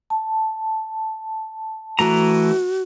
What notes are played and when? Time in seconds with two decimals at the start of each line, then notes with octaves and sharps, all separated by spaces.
0.10 A5
1.99 E3 A3 F#4 A#5